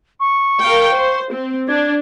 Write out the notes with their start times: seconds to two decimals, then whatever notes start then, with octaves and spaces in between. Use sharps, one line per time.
0.20 C#6
0.61 A#4 F5 G5
0.92 C5
1.32 C4
1.68 D4 G#6